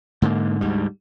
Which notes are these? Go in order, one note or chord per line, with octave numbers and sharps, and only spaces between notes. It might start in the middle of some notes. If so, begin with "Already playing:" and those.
G#2 D3 A#3
D2 G#2 G3